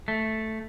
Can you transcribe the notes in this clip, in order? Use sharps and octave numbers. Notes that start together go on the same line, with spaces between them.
A3